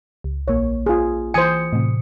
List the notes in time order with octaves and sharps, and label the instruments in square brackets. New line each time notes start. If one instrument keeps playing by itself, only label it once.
[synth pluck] C#2
[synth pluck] A#1 A#3 [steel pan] C#5
[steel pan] F4 G#4
[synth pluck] E3 D#6 C#7 [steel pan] C5 G#5
[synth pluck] A2 C3